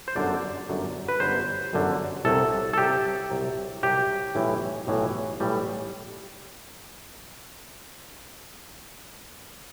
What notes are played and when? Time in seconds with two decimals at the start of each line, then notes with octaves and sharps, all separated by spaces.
0.08 C5
0.15 G1 F#2 D3 F#3 D5
0.68 G1 F#2 D3 F#3
1.09 B4
1.20 G1 F#2 D3 F#3 C5
1.73 G1 F#2 D3 F#3
2.25 C2 C3 F#3 A4
2.73 A4
2.78 C2 C3 F#3 G4
3.30 C2 C3 F#3
3.83 C2 C3 F#3 G4
4.35 B1 A2 E3 G3
4.87 B1 A2 E3 G3
5.40 B1 A2 E3 G3